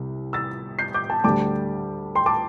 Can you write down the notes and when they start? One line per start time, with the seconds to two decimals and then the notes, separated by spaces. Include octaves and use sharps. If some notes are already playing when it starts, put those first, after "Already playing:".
Already playing: C2 C3
0.33 E6 A6
0.79 G6 C7
0.94 D6 G6
1.10 A5
1.24 D2 D3 G3 A5 D6
2.15 G5 C6
2.26 A5 D6